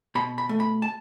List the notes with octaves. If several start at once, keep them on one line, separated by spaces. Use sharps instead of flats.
B2 B5
B5
A3
B5
A5